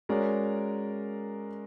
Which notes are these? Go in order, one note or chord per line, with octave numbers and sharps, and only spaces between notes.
G#3 C#4 F#4 A#4 D5